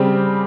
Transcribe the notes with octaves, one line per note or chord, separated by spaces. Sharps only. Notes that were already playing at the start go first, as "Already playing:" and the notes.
Already playing: C#3 G3 C4 G4